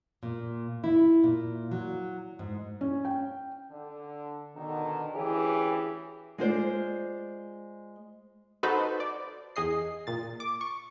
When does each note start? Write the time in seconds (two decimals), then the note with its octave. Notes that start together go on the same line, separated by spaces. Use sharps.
0.23 A#2
0.84 E4
1.24 A#2
1.71 F#3
2.39 G#2
2.81 C#4
3.05 G5
3.71 D3
4.56 B2 D3 D#3
5.14 D2 E3 C#4 G4 G#4
6.38 G#3 F4 C5 D5
8.63 D#4 F#4 A4 B4 C5
9.00 D5
9.56 E2 G#4 D#5 C7
10.07 A#2 A6
10.40 D6
10.61 C#6